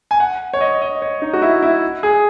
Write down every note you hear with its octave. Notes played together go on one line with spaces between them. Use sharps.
G#5
F#5
C#5
D#5
D#5
C#5
D#4
F#4
E4
E4
G#4